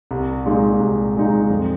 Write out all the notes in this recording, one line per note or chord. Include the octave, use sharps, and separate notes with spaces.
C2
A#2 G#3 D#4
C2
A#2 G#3 D#4
F2